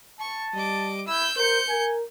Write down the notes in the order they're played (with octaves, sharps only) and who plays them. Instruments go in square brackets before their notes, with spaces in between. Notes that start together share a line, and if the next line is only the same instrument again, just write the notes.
[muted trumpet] A5 [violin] C#6
[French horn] G3 [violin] D#5 D6
[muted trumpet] E4 [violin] E6 G6
[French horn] A#4 [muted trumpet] C5 [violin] G6 C#7
[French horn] A#4 [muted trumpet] G#5